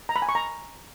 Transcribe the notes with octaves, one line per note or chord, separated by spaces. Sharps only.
A#5
B5
G#5
C#6
A#5